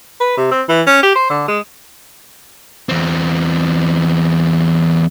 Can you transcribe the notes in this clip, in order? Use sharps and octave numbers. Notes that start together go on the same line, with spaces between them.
B4
C3
C4
E3
C#4
G4
C5
D3
G#3
E2 C4